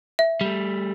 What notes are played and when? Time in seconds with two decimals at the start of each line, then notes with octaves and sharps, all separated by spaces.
0.19 E5
0.41 G3 A3